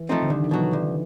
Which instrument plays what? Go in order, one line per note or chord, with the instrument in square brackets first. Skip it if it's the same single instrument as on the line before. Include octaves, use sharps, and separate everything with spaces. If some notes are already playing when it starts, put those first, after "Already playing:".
Already playing: [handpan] E3
[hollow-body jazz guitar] F3 A3 C4 D#4
[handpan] D3
[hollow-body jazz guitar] C2 [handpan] D#3
[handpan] E3
[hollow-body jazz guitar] B2 F#3
[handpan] F3
[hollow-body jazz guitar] C2